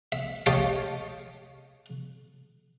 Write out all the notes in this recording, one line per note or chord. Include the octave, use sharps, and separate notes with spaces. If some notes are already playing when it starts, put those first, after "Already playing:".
E5
G4 C#5 D#5 F5 G5 A5